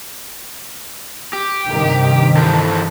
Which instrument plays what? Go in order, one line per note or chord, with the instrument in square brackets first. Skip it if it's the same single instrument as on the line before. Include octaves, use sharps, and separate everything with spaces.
[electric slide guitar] G4
[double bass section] G2 C3 D#3
[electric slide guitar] E3 A4 C5